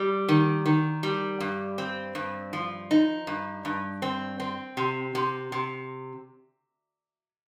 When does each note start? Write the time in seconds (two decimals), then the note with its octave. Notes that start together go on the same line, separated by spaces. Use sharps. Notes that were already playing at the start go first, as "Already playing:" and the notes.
Already playing: G3
0.29 D#3
0.66 D#3
1.03 G3
1.40 G2
1.78 C4
2.15 G2
2.53 F3
2.91 D#4
3.27 G2
3.65 G2
4.02 C4
4.40 C4
4.77 C3
5.15 C3
5.52 C3